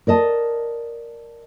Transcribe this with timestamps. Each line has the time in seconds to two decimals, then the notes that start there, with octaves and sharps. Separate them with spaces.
0.07 A#4 D5 D#5 A5